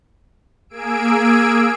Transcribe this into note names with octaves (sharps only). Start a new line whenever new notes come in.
A#3 G#4 G#5 E6 D7